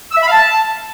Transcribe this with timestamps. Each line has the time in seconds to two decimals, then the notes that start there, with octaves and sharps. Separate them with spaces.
0.11 E6
0.16 E5
0.22 B5
0.27 F5
0.32 A5